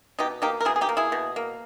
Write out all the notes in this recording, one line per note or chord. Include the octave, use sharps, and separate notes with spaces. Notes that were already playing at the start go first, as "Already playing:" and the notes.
B2 D#4 G4
A#3 D#4 G4
A#4
B2 E4 G#4
G#4
D#4 G4
A#3
E4 G#4
B2
A#3